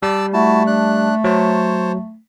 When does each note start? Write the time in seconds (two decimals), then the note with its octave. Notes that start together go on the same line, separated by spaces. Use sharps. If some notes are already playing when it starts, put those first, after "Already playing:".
0.03 G3 D5 A5 E6
0.33 A3 E4 F#4 A5
0.67 D4 F#6
1.24 F#3 C5 C#5 A5